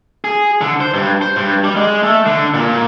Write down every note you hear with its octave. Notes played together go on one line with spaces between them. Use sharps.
G#4
D3
C5
G2
C5
G2
G3
G#3
A3
D3
A#2